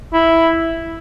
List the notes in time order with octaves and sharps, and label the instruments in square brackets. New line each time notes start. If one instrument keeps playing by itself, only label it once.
[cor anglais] E4